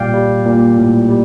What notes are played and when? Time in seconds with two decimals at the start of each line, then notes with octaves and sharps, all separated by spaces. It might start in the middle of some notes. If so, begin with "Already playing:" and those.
Already playing: A#2 G3 D5 F5 G5
0.14 G3
0.45 A#2
0.78 A2
1.09 G3